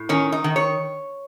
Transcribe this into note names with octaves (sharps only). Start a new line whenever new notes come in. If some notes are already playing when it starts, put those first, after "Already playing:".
Already playing: A2
D#3 C#4
D#4
D#3
C#5